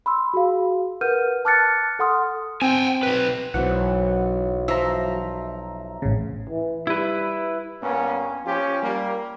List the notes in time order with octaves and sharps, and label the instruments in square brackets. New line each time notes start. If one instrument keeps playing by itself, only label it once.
[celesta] B5 C6 E6
F#4 G#4 F5
A#4 B4 F#5 F6 G6 D#7
A5 D6 F6 F#6 A6 C#7
A4 F#5 C6 D#6 F6
[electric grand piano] C4 [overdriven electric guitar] G5 G#5
[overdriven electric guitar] B1 B4
[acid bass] B1 [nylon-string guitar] E3 F#3 C4 [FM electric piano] F#5
[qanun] F3 [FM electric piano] E5 A#5
[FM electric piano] A1 C#3
[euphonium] E3
[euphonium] G3 [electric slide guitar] E4 B4
[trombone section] G2 A#3 B3 C#4
F3 C#4 F4 G4
G3 A#3